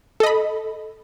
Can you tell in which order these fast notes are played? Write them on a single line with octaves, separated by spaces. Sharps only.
A4 D#5 B5